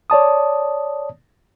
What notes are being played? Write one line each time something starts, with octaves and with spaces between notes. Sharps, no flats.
C#5 D5 A5 D#6